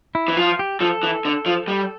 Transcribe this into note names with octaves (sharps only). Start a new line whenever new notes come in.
E4
E3
F3 F4
G4
F3 A4
E3
D3
F3
G3